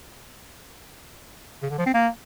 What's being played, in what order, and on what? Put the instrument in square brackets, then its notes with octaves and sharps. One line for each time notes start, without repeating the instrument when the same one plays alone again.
[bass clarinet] C#3
D3
F3
C4
A#3